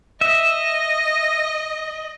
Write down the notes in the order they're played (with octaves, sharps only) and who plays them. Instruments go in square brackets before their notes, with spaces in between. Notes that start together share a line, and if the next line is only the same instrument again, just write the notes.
[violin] D#5 [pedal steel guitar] E5